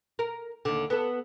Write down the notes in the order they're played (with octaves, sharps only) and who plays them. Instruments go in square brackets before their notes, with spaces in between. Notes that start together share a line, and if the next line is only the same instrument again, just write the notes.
[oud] A#4
D#2 D3
B3 A4